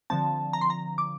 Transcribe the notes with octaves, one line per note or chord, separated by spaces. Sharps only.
D3 F3 C4 A5
A#5
C6
A#5
D6